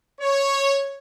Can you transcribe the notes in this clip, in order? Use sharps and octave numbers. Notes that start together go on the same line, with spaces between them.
C#5